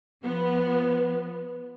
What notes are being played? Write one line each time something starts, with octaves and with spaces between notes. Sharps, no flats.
F3 B3